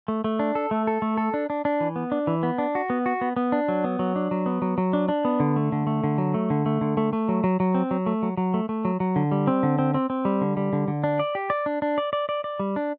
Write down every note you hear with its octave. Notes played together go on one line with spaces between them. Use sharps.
A3
A3
D4
A4
A3
A4
A3
A4
D4
D4
D4
E3
B3
D4
E3
B3
D4
F#4
B3
F#4
B3
B3
D4
F#3
B3
F#3
D4
F#3
B3
F#3
F#3
D4
D4
B3
D3
A3
D3
A3
D3
F#3
A3
D3
A3
D3
A3
A3
F#3
F#3
F#3
C4
F#3
A3
F#3
F#3
A3
A3
F#3
F#3
D3
G3
C4
D3
C4
C4
C4
G3
D3
G3
D3
D3
D4
D5
G4
D5
D4
D4
D5
D5
D5
D5
G3
D4